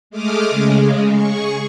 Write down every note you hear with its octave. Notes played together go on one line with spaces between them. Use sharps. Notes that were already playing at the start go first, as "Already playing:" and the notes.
G#3 A3 D6 D#6 F6
C#3 G#3
G#4 C#6